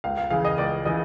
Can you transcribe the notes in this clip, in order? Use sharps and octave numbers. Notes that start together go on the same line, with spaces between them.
C#2 F5
F5
C#3 E3 F5
D#5
C#2 D5
C#3 E3 D#5